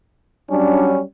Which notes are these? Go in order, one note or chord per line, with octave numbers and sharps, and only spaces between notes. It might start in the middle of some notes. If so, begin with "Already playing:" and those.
F#3 G3 C#4 D4